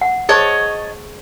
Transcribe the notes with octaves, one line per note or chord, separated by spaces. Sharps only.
F#5
G#4 C5 C#5 D#5 A5 C#6